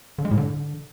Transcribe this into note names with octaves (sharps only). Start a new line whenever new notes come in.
D3
G#3
A2
D3